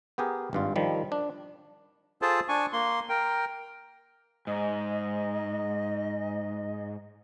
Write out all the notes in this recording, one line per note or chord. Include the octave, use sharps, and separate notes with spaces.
B3 G4 G#4 A#4
G#1 G2 F4
D#3 F3 G3
D4
F4 G#4 A4 C5 A5
D4 G#5 C#6
A#3 C6
A#4 G5
G#2 D#5